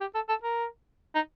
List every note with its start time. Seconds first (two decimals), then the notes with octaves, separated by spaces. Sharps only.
0.01 G4
0.15 A4
0.29 A4
0.44 A#4
1.15 D#4